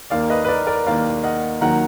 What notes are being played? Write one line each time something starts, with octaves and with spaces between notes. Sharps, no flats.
D#2 D#3 A#3 D5 F5
B4 D#5
B4
A#4 D5
A#4 D5
D#2 D#3 A#3 D5 F5
D#5 F#5
D#2 D#3 F#3 F#5 A#5